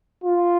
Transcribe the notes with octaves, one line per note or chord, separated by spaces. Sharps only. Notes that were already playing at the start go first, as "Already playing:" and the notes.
F4